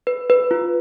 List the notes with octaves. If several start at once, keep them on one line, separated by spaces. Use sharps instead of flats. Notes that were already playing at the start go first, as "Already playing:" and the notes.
B4
B4
F4